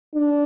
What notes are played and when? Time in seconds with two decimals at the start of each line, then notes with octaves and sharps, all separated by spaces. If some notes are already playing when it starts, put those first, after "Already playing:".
0.15 D4